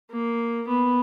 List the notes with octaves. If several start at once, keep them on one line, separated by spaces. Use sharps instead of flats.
A#3
B3